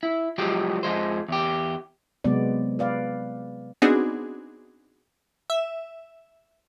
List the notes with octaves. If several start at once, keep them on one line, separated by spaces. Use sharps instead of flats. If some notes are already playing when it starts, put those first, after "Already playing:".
E4
F3 F#3 G#3 G4
F2 F3 G#3 C5
E2 G4
C3 F#3 G#3 B3 D5
B4 D5 F5
B3 C4 D4 D#4 F#4 G#4
E5